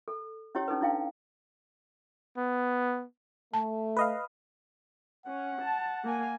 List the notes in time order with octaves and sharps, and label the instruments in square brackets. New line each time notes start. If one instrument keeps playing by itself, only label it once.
[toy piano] A4
C#4 E4 G4 C#5
C#4 D#4 A4 B4
D4 E4 F5 G5
[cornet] B3
[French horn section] A3 [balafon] A5
[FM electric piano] B4 D#5 F5
[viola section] C#4 [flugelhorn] F#5
[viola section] A5
A#3 G#5